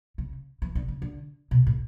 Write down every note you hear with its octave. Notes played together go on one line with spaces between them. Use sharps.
C#3
E3
D3
C#3
D3
B2
A2